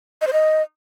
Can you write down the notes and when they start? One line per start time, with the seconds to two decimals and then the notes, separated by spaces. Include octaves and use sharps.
0.21 D#5
0.27 C5
0.33 D#5